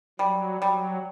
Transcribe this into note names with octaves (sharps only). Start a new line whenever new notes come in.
F#3 G3
F#3 G3